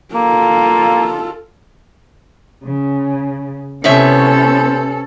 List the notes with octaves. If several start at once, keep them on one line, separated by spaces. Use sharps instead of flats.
A#3 F4 A4
C#3
A2 C3 B3 C#4 A4 C5 C#5 E5